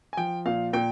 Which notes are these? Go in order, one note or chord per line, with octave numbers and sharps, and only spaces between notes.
G#5
F3 G5
A#2 F5
A#2 G5